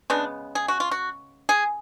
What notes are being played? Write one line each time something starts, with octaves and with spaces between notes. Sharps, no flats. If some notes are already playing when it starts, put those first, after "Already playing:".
C#3 G#3 B3 D4
G#4
F#4
F4
F#4
G#4